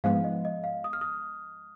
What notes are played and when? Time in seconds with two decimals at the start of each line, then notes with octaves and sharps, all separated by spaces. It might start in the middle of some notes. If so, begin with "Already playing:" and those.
0.04 G#2 F3 G#3 B3 F5
0.24 D#5
0.45 D#5
0.64 F5
0.84 D#6
0.93 F6
1.01 D#6